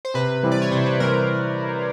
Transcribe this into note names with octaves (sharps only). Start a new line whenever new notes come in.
C5
C3 B4
E3 G3 C4 E4
D5
C#5
C3 C5
B4
E3 G3 C4 E4 A#4